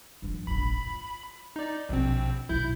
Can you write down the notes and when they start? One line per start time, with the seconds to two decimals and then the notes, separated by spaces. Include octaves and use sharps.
0.22 G2 F3
0.47 F1 A#1 B5
0.86 F4
1.56 D#4 D5
1.89 A#1 B2 A#3 C4
2.49 B1 A#2 E4 G6